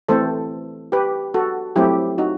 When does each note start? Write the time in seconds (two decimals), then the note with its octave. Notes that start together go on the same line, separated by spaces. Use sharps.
0.09 E3 A3 C4 A4 C5
0.92 G4 B4
1.34 F#4 A4
1.76 F#3 A3 C4 E4 G4
2.18 D#4 F#4